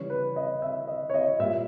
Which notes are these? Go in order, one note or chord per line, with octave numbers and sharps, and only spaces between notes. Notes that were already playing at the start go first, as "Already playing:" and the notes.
Already playing: C#3 E3 G3 C#5
B4
D#5
E5
D#5
C#5
D#5
A#2 G3 E5